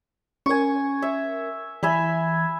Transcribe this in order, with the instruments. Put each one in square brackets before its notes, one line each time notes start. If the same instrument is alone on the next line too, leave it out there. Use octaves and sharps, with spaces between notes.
[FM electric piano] C#4 A#4 [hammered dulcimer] G#5 C#6
[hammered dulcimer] E5
[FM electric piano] E3 [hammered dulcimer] E5 G#5 B5